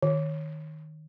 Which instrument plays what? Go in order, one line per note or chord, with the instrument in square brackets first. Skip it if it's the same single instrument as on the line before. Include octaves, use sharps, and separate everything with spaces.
[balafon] D#3